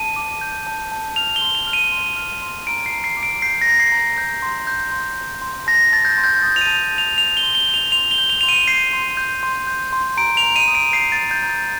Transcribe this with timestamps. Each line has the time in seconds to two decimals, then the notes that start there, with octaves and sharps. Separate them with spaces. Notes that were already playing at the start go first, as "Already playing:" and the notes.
Already playing: A5 D#7
0.16 D6
0.41 G6
0.67 A5
0.92 A5
1.16 F6 F7
1.36 G7
1.42 C6
1.55 F7
1.67 F6
1.73 D#7
1.92 C6
2.16 F6
2.42 C6
2.67 A#5 D7
2.86 C7
2.92 A#5
3.04 C7
3.17 D6
3.23 D7
3.42 G6 C7
3.61 A#6
3.66 A#5
3.80 C7
3.92 A#5
4.18 G6
4.42 C6
4.67 G6
4.92 C6
5.17 G6
5.42 C6
5.67 A5 A#6
5.92 A5 A6
6.05 G6
6.18 C6
6.24 G6
6.42 D#6 A6
6.56 F7
6.61 D#7
6.67 A5
6.92 A5
6.98 F7
7.18 G6 F7
7.37 G7
7.43 C6
7.55 G7
7.67 G6
7.74 F7
7.92 C6 F7
8.11 G7
8.18 G6
8.30 F7
8.41 C6 F7
8.49 D#7
8.68 G6 C7
8.93 C6
9.17 G6
9.43 C6
9.67 G6
9.93 C6
10.17 A#5 D7
10.37 F7
10.43 A#5
10.56 D#7
10.67 D#6
10.75 D7
10.92 G6 C7
11.12 A6
11.18 A#5
11.31 G6
11.44 A#5
11.50 A6